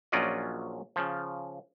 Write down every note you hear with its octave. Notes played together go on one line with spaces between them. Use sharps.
A#1 F#3 C#4 F4 D5 D#5
C#3 F3